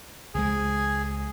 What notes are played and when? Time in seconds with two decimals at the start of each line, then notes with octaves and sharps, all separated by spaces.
0.35 C#2 F3 G#3 G#4